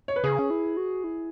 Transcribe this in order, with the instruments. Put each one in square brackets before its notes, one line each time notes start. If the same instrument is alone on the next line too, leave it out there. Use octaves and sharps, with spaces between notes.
[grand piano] C#5
B4
[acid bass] C#3 [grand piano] G#4
[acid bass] C#4
E4
F#4
E4